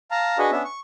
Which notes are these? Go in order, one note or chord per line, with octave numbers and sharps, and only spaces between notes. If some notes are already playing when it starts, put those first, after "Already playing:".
F5 A5 A#5
D4 F#4 G#4 B4 D#5
B3 C#4 D4 E5
C#6